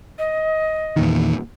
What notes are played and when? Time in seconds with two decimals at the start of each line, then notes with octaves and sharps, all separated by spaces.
0.18 D#5
0.96 E2 A#2 D#3